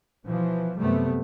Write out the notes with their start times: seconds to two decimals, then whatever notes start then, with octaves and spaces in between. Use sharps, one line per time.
0.25 B2 E3 F3
0.78 F#2 C3 G3 A3 B3